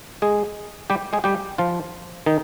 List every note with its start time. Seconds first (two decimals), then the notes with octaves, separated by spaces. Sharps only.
0.22 G#3 G#4
0.90 G3 G4
1.13 G#3 G#4
1.24 G3 G4
1.58 F3 F4
2.26 D#3 D#4